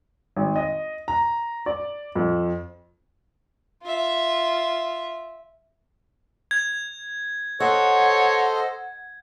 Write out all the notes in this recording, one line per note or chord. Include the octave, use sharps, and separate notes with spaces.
G#1
D#5
A#5
D5
F2
F4 E5
G#6
A4 C5 C#5 D#5 F#5